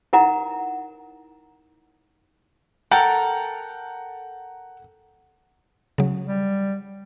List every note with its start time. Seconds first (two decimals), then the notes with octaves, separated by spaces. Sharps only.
0.13 D#4 E4 A#4 F#5 A#5
2.91 A4 A#4 F#5 G5 A#5
5.98 C#3 F#3
6.25 G3